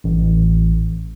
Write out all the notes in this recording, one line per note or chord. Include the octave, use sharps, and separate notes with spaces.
A1